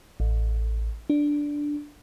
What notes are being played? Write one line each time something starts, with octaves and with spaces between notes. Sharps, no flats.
A1
D4